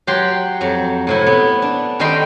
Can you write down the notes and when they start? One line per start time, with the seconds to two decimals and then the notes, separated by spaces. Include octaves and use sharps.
0.07 F#3 G4 F#5 C6
0.61 F2 F#3
1.07 A2 C3 E4
1.26 B3
1.62 D4
1.99 D#3 G3 A3 D#5 G5 C6